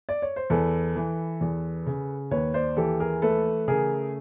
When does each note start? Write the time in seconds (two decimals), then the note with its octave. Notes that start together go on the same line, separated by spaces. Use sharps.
0.09 D5
0.22 C#5
0.36 C5
0.50 E2 A4 B4
0.96 E3
1.41 E2
1.86 C#3
2.31 D#2 B4 C#5
2.54 C5 D5
2.77 E3 G4 A4
3.00 G#4 A#4
3.22 A3 A4 B4
3.68 C#3 G#4 A#4